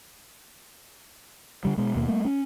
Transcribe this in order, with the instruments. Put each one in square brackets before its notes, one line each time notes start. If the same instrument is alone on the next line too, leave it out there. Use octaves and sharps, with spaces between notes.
[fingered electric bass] D3 G3
B2 G#3
D#2 B2 A#3
G3 A3 A#3
C#4